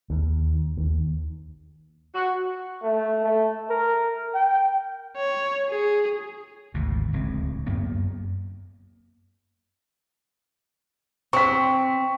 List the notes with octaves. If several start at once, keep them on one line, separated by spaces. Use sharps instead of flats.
D#2
D#2
F#4
A3
A3
A#4
G5
C#5
G#4
G#1 D2 G#2 B2
D1 C#2 G#3 C4
F#2 A#3 B3
C4 C#6 B6